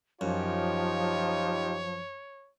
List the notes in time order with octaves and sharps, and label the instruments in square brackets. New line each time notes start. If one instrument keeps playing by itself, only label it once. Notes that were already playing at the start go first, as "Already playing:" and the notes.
[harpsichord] F#2 [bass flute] F3 [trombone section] D#4 F4 G4 [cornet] C#5